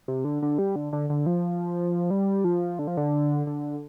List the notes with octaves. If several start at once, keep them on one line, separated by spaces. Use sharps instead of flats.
C3
D3
D3
G3
D3
D3
D3
F3
G3
F3
D3
F3
D3
D3